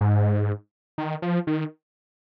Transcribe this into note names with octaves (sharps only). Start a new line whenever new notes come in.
G#2
D#3
F3
D#3